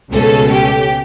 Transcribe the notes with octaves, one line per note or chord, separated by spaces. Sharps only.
C#2 B2 A3 C#4 A4
G4